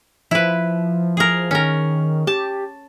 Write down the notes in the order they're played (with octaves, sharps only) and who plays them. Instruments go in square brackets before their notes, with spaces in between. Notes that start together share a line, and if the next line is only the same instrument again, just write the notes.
[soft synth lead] F3 [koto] E4 B4
[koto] G#4 A#4
[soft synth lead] D#3 [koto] C#4 A#4
[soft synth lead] G4 [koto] A5